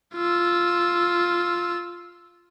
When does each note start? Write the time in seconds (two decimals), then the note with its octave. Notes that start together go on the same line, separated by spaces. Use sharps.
0.15 F4 E6